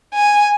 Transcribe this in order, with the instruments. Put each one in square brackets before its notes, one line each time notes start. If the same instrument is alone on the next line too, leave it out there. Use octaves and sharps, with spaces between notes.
[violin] G#5